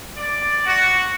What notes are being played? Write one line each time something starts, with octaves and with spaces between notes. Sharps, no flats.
D5
F#4